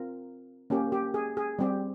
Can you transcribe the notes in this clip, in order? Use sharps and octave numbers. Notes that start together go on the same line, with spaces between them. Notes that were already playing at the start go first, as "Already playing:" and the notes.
Already playing: C4 F4 A#4
A#3 C#4 G4
G4
G#4
G#4
G3 C4 G4